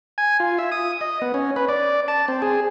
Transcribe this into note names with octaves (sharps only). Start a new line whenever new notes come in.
G#5
F4
E5
D#6
D#5
B3
C#4
B4
D5
A5
C4
G#4